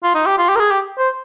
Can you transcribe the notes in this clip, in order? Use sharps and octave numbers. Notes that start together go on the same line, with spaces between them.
F4
D#4
G4
F4
G4
A#4
G#4
G4
C5